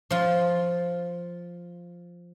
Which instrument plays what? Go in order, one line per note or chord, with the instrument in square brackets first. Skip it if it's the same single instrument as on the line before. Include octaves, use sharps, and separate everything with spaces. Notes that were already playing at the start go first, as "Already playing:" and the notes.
[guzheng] F3 F4